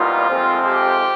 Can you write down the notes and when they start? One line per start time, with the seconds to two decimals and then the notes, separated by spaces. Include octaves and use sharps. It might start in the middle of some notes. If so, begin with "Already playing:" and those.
Already playing: C2 A#2 G3 B3 D#4 F4
0.29 F2 C3 F3 G#3 C4
0.66 G4